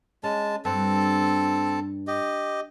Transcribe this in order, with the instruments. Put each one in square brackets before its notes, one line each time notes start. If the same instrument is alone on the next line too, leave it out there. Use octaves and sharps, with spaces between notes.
[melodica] G#3 A5 [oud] C#4
[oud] G2 [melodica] C4 A4 A5
[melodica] G4 D#5